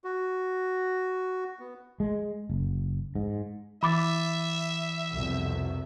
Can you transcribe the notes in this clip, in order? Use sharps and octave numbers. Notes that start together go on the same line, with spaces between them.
F#4
B3
G#3
F#1
G#2
E3 E5 B5 D6 A6
C2 F2 B2